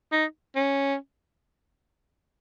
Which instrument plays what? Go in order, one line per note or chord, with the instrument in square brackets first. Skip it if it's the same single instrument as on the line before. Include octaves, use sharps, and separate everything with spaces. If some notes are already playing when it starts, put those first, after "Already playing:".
[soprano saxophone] D#4
C#4